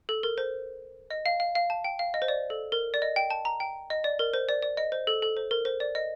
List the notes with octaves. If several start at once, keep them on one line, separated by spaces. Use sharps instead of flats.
A4
A#4
C5
D#5
F5
F5
F5
A5
G5
F5
D#5
C5
D5
A4
A#4
D5
D#5
G5
A5
A#5
G5
D#5
D5
A#4
C5
D5
D5
D#5
C5
A4
A4
C5
A#4
C5
D5
D#5